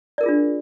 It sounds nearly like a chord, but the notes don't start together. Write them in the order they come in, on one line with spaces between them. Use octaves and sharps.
D5 A#4 G#4 F4 D4